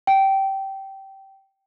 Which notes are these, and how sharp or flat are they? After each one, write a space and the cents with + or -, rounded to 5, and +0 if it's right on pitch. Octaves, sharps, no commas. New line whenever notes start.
G5 -15